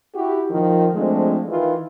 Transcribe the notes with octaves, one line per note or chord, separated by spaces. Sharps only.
E4 F#4 G4
A#2 D#3 F3
F3 G#3 A3 C4 D4
D#3 E3 F4